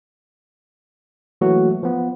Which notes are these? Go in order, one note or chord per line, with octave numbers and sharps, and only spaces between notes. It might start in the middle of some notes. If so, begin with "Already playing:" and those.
E3 F#3 A3 A#3 F#4
F3 B3